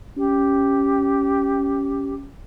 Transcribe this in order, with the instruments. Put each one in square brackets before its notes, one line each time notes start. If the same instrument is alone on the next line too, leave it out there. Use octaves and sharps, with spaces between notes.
[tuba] C#4 [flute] G4